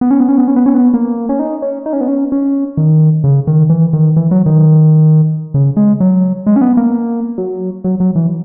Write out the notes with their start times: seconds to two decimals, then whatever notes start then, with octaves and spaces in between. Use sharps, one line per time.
0.01 B3
0.11 C#4
0.20 B3
0.29 C#4
0.38 B3
0.48 C#4
0.56 B3
0.66 C#4
0.74 B3
0.94 A#3
1.29 C#4
1.39 D#4
1.62 C#4
1.86 D#4
1.93 C#4
2.01 B3
2.08 C#4
2.32 C#4
2.77 D#3
3.24 C#3
3.47 D#3
3.70 E3
3.93 D#3
4.17 E3
4.31 F#3
4.46 D#3
5.54 C#3
5.77 G#3
6.00 F#3
6.47 G#3
6.56 C#4
6.61 B3
6.77 A#3
7.38 F#3
7.84 F#3
8.00 F#3
8.15 E3